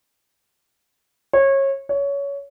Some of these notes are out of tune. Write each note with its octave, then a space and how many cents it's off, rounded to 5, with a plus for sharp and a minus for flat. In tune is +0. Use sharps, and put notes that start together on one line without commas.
C#5 -25
C#5 +20